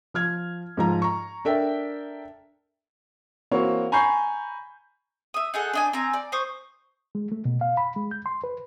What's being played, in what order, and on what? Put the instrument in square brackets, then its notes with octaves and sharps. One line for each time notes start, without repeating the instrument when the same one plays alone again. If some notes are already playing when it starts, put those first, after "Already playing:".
[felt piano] F3 F6 G#6
G#2 F3 A#5
A#5 C#6
D4 A4 A#4 E5 G5
[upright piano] E3 A#3 C4 F#4 C#5
G#5 A#5 B5 C#6 G6 C7
[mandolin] E5 D#6
D#4 G#4 A4 F#5
D4 D#4 G#5
C4 G#5 A#5
D5
C5 C#6 D#6
[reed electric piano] G#3
A3
B2
F5
B5
G#3
G6
C6
B4